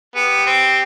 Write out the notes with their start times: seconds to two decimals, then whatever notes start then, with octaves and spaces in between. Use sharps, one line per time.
0.15 B3 G4
0.46 C4